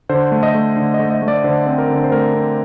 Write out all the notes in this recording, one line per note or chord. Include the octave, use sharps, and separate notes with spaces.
D3 C5
A3
D#5
A3
D3
D#5
A3
D#5
A3
D5
D3 C5
C4
A#4
D3
C5
A3 A#4
C4